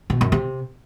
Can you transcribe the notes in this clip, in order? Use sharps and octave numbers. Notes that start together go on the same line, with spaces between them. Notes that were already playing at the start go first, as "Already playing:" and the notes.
B2
F#2
C3